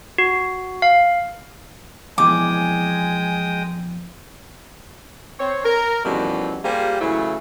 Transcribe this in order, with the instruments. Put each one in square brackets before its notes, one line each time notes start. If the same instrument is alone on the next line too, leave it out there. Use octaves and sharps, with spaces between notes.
[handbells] F#4
F5
[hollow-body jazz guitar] F2 B2 E3 [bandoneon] G#3 G5 D#6 [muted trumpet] G#5 [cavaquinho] D6
[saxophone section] C4 C#5
A#4
F2 B2 D#3 E3 G3 C#4
G3 A#3 F4 G4 G#4 C5
C#3 E3 F#3 A3 E4